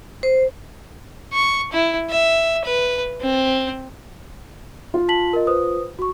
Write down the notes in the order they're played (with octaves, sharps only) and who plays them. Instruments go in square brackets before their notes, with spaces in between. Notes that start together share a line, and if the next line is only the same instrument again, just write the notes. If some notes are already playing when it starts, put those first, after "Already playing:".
[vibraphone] C5
[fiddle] C#6
E4
E5
B4
C4
[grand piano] F4
[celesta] A5 B6 F#7
A#4 D#5
B4 C5 D#6
F#4 C#6